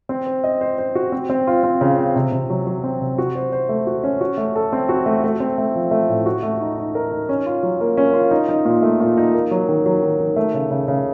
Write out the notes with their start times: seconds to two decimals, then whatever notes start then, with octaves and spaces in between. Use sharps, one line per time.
0.09 C4
0.26 C5
0.44 D#5
0.61 C5
0.78 C5
0.95 F#4
1.12 C4
1.29 C4
1.47 F4
1.63 C4
1.81 C#3
1.99 C4
2.16 C3
2.32 C3
2.50 F#3
2.67 F#3
2.84 C4
3.01 C3
3.18 F#4
3.35 C5
3.52 C5
3.69 A3
3.87 F#4
4.04 C#4
4.21 F#4
4.37 A3
4.55 A4
4.73 C4
4.89 F#4
5.06 A3
5.24 A3
5.40 C4
5.58 A3
5.75 F3
5.91 A3
6.09 A2
6.26 F#4
6.43 A3
6.61 D#4
6.78 D#4
6.95 A#4
7.11 D#4
7.29 C#4
7.46 F4
7.63 F#3
7.80 A#3
7.97 C#4
8.14 F4
8.31 D#4
8.49 D#4
8.65 A#2
8.82 A3
9.00 A#2
9.17 D#4
9.34 A#3
9.51 F#3
9.69 D#3
9.86 F#3
10.02 D#3
10.20 D#3
10.36 A3
10.54 C#3
10.71 C#3
10.88 C#3